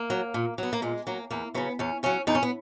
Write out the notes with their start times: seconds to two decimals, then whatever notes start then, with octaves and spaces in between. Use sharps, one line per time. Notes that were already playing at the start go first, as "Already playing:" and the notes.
Already playing: A#3
0.10 F#3
0.34 A#2
0.58 F#3 B3
0.73 A#3
0.82 A#2 G#3
1.07 F#3 A#3
1.31 E2 A#3
1.54 C#3 F#3 B3
1.79 E2 C#4
2.03 C#3 F#3 C#4
2.27 E2 D#4
2.35 C#4
2.43 B3